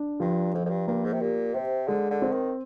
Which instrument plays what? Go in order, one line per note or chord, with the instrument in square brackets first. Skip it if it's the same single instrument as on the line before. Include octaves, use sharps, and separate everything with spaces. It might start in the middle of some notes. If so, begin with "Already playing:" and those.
Already playing: [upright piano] D4
[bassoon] G2 [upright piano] F3
[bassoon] F2 [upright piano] F3
[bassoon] F2
G2
[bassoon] G2 [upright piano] A#3
[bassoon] G#2
C3
[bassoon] A#2 [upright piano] G4
[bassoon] C3 [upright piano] C5
[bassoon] D3 [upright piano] G#3
[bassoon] D3
[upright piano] C4
[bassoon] D#3